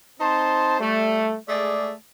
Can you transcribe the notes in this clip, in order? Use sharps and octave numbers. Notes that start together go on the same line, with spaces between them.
C4 D#4 C5 A5 C6
G3 A3
G#3 A3 G#4 D5